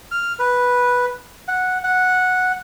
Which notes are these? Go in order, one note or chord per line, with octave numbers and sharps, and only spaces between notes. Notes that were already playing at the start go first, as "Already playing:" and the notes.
F6
B4
F#5
F#5